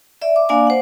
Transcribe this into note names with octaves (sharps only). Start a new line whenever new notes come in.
D5 E5
D6
A#3 D4 D5 F5 G#5 D6
C5 F#5